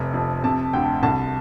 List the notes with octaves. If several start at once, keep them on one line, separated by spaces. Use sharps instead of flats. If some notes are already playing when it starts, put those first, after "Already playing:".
Already playing: F1 C3
F2
C3 A5
D2 G5
C2 A5